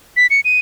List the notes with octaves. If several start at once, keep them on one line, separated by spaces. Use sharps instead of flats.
B6
C#7
D#7